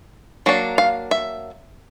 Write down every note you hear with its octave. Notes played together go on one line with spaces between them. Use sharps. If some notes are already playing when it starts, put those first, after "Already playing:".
F#3 A#3 D4
F5
E5